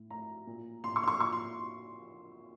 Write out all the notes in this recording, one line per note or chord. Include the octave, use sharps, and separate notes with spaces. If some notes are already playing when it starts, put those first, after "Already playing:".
Already playing: A2
A2 A#5
A#2
A#2 C6
C#6
C6
C#6
A#2 C#6
C6